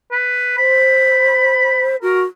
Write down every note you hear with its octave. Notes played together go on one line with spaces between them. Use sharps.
B4
C5 B5
F#4 A#4